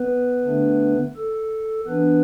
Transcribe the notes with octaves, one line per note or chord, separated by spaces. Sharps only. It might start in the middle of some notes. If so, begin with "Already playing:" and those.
Already playing: B3 B4
D3 A3 D4
A4
E3 B3 D4 B4